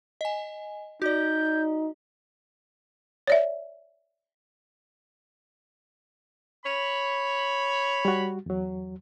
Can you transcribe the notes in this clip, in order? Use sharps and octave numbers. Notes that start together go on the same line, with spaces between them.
D#5 G#5
D#4 F#4 D5 G6
C#5 D5 E5
C#5 B5
G3 F#4
E2 F#3